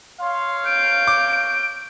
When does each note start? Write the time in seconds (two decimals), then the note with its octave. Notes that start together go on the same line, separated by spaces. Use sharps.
0.21 C#5 F5 C6
0.66 G6 D7
1.07 D6